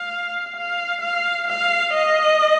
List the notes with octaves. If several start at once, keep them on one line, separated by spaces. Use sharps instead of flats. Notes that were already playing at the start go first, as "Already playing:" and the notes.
Already playing: F5
F5
F5
F5
D#5